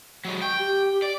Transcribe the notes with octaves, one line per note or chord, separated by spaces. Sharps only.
F#3 G#3
G5 C#6
G4
D5